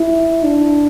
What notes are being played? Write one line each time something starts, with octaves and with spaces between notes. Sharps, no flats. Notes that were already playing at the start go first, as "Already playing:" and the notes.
Already playing: E4
D4